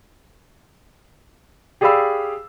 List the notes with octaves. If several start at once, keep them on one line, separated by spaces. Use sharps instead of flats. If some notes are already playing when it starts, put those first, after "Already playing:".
G4 G#4 D5 F5 B5 E6